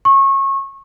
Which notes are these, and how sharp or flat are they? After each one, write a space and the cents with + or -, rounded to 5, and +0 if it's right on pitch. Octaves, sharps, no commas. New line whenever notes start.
C#6 -25